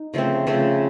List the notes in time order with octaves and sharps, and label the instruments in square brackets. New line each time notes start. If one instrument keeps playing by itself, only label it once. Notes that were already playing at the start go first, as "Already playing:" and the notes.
Already playing: [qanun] D#4
C#3 F3 A3 C4
C#3 F3 A3 C4